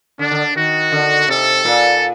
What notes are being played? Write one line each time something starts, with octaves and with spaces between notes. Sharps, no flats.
D3 D4
D3
D#3 F#4
D3
C3 A4
A#2